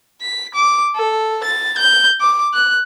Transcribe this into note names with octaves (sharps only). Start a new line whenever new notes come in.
B6
D6
A4
A6
G6
D6
F#6